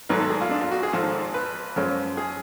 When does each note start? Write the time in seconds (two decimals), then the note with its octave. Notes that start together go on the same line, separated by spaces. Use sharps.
0.09 G#1 G#2 F#3 A3 B4
0.20 A4
0.30 G#4
0.41 F4
0.51 D4
0.61 F4
0.71 F#4
0.83 G#4
0.93 G#1 G#2 F3 A4
1.34 B4
1.76 F#2 F3 G#3 C#4
2.17 G#4